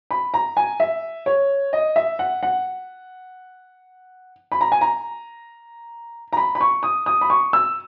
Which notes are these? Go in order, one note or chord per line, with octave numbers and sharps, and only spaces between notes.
B5
A#5
G#5
E5
C#5
D#5
E5
F#5
F#5
B5
A#5
G#5
A#5
A#5
B5
B5
C#6
D#6
D#6
B5
C#6
E6